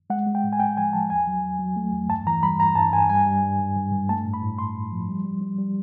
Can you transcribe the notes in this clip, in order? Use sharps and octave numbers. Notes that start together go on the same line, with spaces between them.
G#3 F#5
G#3
G5
A2
G#5
G#3 G5
F3 G#5
F3 A5
E2 G#5
F#3
E2
F#3
A3
E2
G2 A5
E3 A#5
G3 B5
G2 A#5
G2 A5
G2 G#5
G3 G#5
G3
G2
G2
G2
G2
A3 A5
A2
B5
A2
A2 C6
A2
F3
G3
G3
G3
G3